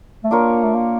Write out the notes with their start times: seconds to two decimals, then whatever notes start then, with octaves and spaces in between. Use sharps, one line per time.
0.24 A3
0.31 A#3 D4 F4 A#4 C#5
0.63 A3
0.74 A#3